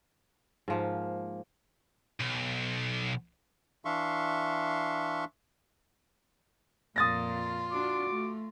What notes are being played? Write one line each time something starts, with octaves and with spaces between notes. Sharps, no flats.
G#2 F3 A#3
B1
E3 D4 E5 F5 C6 C#6
F2 A#2 F4 D#6 A6 A#6
D4 F#4 D6
A3